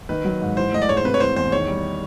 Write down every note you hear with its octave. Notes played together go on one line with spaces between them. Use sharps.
D#3 B4
F#3
G#2
E3 C5
A3 D#5
D5
G#2 C#5
C5
C3 B4
C#5
E3 C5
E2 C5
D#3 C#5
G3